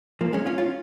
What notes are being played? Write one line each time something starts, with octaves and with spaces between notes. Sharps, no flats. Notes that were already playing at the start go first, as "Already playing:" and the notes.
F3 A#3
G#3 C#4
C#4 F4
C#4 F4